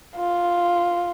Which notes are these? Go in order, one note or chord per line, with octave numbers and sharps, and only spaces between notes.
F4